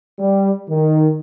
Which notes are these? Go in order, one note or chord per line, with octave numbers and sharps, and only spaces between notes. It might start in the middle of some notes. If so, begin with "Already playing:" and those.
G3
D#3